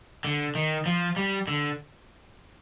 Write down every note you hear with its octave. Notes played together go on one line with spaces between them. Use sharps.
D3
D#3
F3
G3
D3